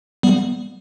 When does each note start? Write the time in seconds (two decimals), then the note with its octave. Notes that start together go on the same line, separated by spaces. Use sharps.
0.23 G3 B3